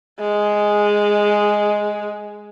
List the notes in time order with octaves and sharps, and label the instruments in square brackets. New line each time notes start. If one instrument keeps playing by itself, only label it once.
[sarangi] G#3